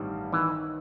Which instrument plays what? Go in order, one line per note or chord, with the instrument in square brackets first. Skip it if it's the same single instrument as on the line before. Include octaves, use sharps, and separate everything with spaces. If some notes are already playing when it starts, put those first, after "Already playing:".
Already playing: [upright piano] A1 G2 D#3 G3
[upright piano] D#3 [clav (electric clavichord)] E3